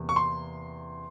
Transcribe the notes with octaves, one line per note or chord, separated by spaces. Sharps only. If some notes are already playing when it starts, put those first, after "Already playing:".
Already playing: E2 C3 A#3
C#6
C6